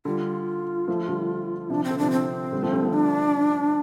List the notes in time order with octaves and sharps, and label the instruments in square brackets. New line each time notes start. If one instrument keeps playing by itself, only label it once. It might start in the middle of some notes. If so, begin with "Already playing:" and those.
[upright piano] D3 G3 [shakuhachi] F4
[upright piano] F3 A3
D3 G3
[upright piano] C3 F3 [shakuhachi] D4
[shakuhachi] C4
[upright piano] D3
[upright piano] C3 F3 [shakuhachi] D4
[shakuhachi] C4
[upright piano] D3 G3
F3 A3
D3 G3
F3 A3
[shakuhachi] D4